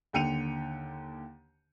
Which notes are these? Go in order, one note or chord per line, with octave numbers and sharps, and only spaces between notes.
D#2 D3 G5 C#7 D#7 F7